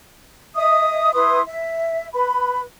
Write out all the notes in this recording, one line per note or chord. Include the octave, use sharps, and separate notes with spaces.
D#5 E5 D#6
E4 B4 C6 D#6
E5
B4 B5